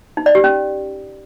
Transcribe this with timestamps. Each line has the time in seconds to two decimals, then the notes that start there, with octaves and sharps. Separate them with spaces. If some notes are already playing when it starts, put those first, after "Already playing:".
0.17 D#4
0.26 D5
0.35 G4
0.44 C#4